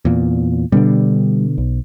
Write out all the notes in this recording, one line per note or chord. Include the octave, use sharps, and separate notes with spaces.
E2 A#2
B2 D3 G3 D4
B1